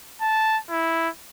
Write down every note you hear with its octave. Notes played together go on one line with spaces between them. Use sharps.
A5
E4